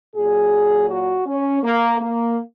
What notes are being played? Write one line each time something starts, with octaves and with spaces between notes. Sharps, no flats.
A#2 F#3 G#4
F#4
C#4
A#3
A#3